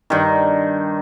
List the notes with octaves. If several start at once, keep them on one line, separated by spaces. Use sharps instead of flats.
G2 D#3